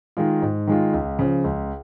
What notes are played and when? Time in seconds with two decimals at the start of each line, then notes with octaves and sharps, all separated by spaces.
0.17 D#3 G#3 F4
0.42 G#2
0.67 D#3 G#3 F4
0.93 C#2
1.19 C#3 F3
1.44 C#2